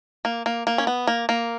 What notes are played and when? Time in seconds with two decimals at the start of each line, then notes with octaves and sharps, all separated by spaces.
0.25 A#3
0.46 A#3
0.67 A#3
0.78 C#4
0.87 B3
1.07 A#3
1.29 A#3